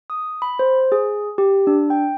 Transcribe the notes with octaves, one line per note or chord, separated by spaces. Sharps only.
D#6
B5
C5
G#4
G4
D4
G5